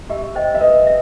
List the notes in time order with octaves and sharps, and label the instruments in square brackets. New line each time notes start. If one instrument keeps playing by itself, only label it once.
[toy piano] G4 [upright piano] E5
[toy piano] C5 D#5 G5
[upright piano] E5
[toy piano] B4 [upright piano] D#5
[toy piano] E5